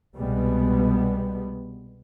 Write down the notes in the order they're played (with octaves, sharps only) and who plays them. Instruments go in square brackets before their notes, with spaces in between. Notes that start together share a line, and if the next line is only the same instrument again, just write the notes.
[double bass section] C2 B2 G3 G#3 B3